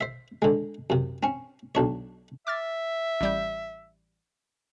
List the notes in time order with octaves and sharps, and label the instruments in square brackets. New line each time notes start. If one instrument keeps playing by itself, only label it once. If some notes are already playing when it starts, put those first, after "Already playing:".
[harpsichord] C5 E5
D3 G#3
F#2 C3
C4 C#4
B1 D4 C#5
[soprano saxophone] E5 [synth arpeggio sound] D6 F6 A6
[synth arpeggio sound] A1 G3 G6